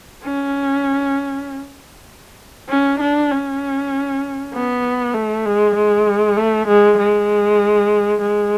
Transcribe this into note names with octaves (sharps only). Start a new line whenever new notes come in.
C#4
C#4
D4
C#4
B3
A3
G#3
G#3
A3
G#3
G#3
G#3